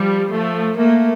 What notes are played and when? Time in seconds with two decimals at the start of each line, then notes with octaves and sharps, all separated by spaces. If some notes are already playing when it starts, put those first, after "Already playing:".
Already playing: F3 G3
0.31 F3 A3
0.77 A3 A#3